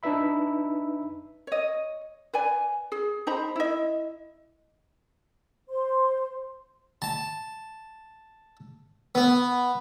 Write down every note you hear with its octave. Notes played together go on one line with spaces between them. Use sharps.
D4 D#4 B4 E5 B5
C#5 D#5
B4 D5 G#5
G#4
D#4 C5 A#5 B5
E4 D#5
C5 C6
A5
B3